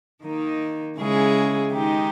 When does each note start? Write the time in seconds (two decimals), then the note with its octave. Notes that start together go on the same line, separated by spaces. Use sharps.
0.24 D#3 A#3 D#4
0.99 C#3 G#3 C#4 E4 G#4
1.73 D#3 G#3 D#4 G4